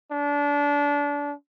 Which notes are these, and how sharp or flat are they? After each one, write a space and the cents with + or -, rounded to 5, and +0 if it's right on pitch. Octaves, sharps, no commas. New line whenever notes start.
D4 -25